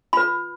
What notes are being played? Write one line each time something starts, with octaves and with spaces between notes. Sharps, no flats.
F4 B4 B5